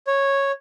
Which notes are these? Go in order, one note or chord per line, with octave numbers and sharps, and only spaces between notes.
C#5